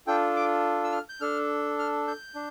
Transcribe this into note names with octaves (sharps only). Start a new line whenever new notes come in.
D4 F4 A4 G5
D6
E6
F6
G6
D4 A4 F6
F6
G6
D4